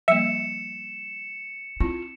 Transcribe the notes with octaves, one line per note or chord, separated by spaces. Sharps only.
F3 G3 A#3 E5 C#7 E7
C4 E4 F4